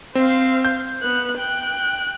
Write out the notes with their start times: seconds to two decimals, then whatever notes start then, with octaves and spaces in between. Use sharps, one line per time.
0.15 C4 C5 F5
0.65 G6
1.02 B3 F#6
1.38 G5 F#6